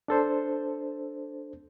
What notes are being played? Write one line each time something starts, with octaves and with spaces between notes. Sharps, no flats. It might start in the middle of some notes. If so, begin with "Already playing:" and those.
D4 A4 C5